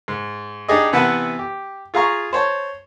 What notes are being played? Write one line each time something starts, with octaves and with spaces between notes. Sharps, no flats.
G#2
D4 D#4 G4 G#4 D5 D#5
C3 E3 B3 B4 F#5 A5
G4
F4 G#4 F5 A#5 C#6
C5 C#5 A5